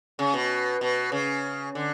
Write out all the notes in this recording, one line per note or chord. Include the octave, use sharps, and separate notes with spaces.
C#3
B2
B2
C#3
D3